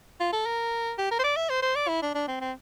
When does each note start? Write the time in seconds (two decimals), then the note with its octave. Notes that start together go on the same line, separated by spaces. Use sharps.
0.20 F4
0.33 A4
0.46 A#4
0.98 G4
1.11 A#4
1.19 C5
1.24 D5
1.36 E5
1.50 C5
1.62 C5
1.76 D5
1.88 E4
2.02 D4
2.15 D4
2.28 C4
2.41 C4